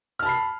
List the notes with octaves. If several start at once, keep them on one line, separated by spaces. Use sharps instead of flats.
A5 B5 F6 C7